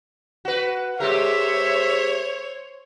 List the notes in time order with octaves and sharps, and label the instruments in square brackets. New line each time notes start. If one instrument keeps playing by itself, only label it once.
[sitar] F#4 B4
[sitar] G#3 G4 A#4 [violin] C5 C#5 [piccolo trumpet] E5